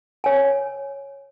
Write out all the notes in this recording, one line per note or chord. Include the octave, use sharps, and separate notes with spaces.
C#5 G#5